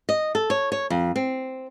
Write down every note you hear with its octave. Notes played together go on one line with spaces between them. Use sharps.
D#5
A4
C#5
C#5
F2
C4